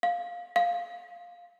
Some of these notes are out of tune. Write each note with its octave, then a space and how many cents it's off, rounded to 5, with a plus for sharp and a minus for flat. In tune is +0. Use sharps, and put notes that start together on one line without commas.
F5 +10
F5 +5